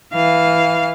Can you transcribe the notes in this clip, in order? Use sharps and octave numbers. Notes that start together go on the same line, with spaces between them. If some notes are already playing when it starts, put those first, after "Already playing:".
E3 F5